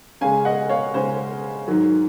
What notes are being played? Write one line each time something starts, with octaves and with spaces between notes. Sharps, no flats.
C#3 G#3 C#4 F5 G#5
D#5 F#5
C#5 F5
C#3 G#3 C#4 C5
G#2 D#3 F#3